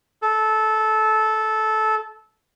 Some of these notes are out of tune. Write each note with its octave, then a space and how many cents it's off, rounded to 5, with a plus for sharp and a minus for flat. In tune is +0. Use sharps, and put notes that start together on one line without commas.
A4 -15